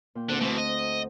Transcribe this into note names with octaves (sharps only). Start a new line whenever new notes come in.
A#2 G5
D2 D3 C4 F#5
B2 E3 A3 C4
D#5